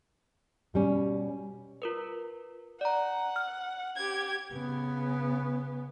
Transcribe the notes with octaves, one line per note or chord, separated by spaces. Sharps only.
B2 G3 C#4
F4 A#4 B4
D5 F#5 A#5
F6
G4 G#6
C#3 B3